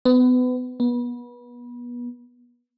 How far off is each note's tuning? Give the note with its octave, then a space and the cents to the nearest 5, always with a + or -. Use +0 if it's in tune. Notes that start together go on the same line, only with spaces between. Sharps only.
B3 +30
B3 -30